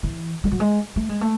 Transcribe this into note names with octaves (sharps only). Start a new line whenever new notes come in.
E3
G#3
F#3
G#3
A3
G#3
A3